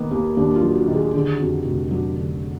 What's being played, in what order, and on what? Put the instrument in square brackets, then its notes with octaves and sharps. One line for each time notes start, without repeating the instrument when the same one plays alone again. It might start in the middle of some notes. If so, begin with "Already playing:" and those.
Already playing: [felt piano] D#3 A#3 B3
D#2 A#3
D#2 D4
F4
F#3
F#4
D#3
G#4
D3 G#4
F2 F#4
F1 F#4
F#3 D4
D3